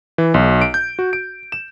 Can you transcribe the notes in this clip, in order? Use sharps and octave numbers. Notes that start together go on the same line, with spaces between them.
E3
B1
D7
G6
F#4
D7
E7